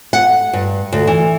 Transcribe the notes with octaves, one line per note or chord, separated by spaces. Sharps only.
F#5
G2
D2
E3